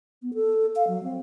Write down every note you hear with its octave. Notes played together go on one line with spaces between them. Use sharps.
B3
A4
F5
F#3
C4